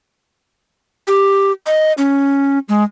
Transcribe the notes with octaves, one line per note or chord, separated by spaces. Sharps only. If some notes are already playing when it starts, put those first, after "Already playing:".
G4
D#5
C#4
G#3